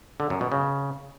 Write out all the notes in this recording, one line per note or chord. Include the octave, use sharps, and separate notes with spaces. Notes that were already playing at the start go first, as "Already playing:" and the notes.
D3
F#2
B2
C#3